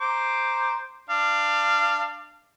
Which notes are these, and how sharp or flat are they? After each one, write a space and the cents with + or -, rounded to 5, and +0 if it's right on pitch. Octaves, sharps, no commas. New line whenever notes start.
C5 +0 A#5 +0 D6 +0
D4 +15 F5 -20